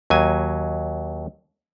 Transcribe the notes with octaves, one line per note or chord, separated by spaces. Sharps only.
D#2 F#3 G#5